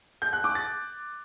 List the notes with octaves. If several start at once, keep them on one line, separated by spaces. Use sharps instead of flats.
G6
F#6
D6
A6